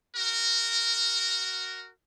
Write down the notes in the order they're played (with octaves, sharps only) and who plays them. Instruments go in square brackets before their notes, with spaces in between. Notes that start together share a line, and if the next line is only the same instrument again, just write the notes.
[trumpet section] F#4 A#4